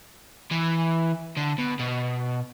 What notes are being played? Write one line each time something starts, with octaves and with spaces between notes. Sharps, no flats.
E3
D3
B2
B2